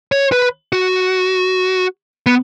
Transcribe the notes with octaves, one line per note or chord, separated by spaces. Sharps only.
C#5
B4
F#4
B3